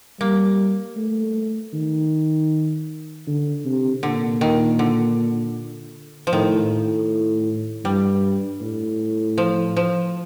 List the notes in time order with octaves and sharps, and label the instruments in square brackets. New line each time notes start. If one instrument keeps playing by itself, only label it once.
[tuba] G3 [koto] A#3
[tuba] A3
D#3
D3
C3
[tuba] A#2 [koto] D3
[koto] D#3
D3
F3
[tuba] A2 [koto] D#3
[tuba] A2
[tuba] G2 [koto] G3
[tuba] A2
[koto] F3
F3